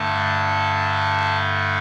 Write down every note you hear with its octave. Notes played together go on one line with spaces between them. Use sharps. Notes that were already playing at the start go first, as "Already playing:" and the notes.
Already playing: G2 D3 A3 A5